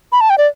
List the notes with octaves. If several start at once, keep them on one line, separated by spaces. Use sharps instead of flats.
B5
A5
G5
D5